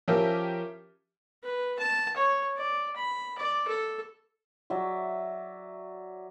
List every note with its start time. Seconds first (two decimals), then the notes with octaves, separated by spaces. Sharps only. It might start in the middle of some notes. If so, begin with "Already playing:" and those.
0.08 F3 C#4 G4 A#4 E5
1.43 B4
1.79 A5
2.16 C#5
2.56 D5
2.96 B5
3.38 D5
3.68 A4
4.70 F#3 D5 E5